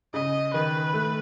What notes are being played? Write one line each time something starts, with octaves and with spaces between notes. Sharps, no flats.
C#3 D#5
D#3 B4
A3